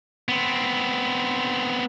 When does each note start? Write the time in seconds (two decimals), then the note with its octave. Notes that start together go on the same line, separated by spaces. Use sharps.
0.29 B3 C4